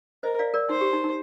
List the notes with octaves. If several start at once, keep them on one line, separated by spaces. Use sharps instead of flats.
A#4 C5 D#5
D5 F5
A#4 D5
D#4 C5
G4
D#4
D#4